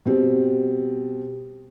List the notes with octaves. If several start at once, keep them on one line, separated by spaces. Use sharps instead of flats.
B2 G3 C4